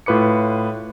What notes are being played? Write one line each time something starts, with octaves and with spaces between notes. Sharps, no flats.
A2 F4 B4 D6 C#7